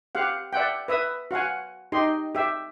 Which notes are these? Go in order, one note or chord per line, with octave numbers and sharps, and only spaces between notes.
G4 F5 F#5
D5 E5 F#5 G5
B4 E5 D#6
F#4 F5 F#5 G#5
D#4 G4 D#5 C6
G4 E5